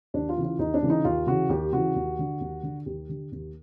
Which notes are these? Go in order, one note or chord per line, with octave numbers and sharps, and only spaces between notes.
D#2 D4
F4
C#3 E3
F4
D#2 D#4
D4
C#3 E3
D#4
D#2 F4
C#3 E3 F#4
D#2 G4
C#3 E3 F#4
D#2
D3
D#2
D3
D#2 G4
D3
D#2